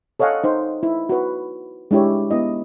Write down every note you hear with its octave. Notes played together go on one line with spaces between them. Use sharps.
A4 C#5 D#5 F5 F#5 G#5
D#4 C5
E4
F#4 B4
G#3 D4 E4 G4 C#5
B3 E4 D#5